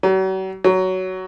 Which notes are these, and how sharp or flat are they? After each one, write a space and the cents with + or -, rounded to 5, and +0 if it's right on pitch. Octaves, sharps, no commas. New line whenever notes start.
F#3 +45
F#3 +15